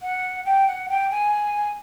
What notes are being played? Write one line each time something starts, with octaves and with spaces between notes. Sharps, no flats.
F#5
G5
F#5
G5
G#5